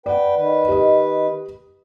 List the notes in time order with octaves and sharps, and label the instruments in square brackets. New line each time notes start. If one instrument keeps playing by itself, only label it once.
[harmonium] B4 G5 [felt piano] D5 F#5
[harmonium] D#3 B4
[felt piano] G4 D#5